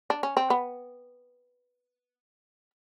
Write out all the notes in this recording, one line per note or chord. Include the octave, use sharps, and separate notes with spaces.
D4
C#4
C4
B3